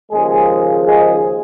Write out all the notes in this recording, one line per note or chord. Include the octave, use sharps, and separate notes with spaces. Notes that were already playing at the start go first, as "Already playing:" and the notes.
D#2 C#3 F3 G#3 G#4
G#3 G#4